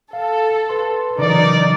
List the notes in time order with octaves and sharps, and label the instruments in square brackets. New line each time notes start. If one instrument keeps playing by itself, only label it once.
[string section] A4 [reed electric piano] F5
[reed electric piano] B4 C6
[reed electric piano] C#3 E3 [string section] F#3 D#4 [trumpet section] A#4 D5